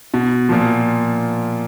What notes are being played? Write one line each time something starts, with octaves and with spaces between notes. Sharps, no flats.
B2
A#2 F3